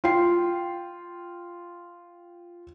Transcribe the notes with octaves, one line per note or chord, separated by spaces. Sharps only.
F4 G5 C7